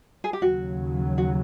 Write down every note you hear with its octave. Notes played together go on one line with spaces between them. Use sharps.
G#4
G4
D#2 C#3 F#3 F#4
F#4